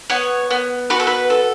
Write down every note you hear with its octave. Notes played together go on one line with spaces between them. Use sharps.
B3 C#5
B3
F#4 B4
A4
B4
A4